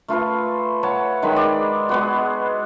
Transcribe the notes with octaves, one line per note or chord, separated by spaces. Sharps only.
A3 F4 A4 B4
C#5 F#5 A5
D#3 G#3 B5 C6
D5
G#3 B3 F#4